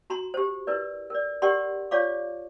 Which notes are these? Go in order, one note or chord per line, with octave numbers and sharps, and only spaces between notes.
F#4 A#5 C6
G4 C5
E4 A#4 B4 D5
A#4 D5
G4 A#4 D5 F#5 A#5 C6
F4 C#5 D5 F5 C#6 D6